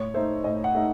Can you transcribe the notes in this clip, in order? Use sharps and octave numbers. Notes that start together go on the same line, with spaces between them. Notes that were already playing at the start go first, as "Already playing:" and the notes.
Already playing: A2 C#5
A3 D#4 C5
A2 D#5
F#5
A3 D#4